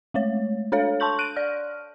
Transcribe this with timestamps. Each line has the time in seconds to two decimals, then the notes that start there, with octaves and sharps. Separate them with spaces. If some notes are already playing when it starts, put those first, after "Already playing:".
0.14 G#3 A3 C#5
0.72 D4 A4 C#5 F5
1.00 A5 C6 C#6 G6 F#7
1.19 F#6 D7 D#7
1.36 D5 F6